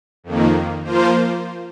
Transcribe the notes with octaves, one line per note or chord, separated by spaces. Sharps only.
F2 D#3 A#3
F3 A#3 F4 C5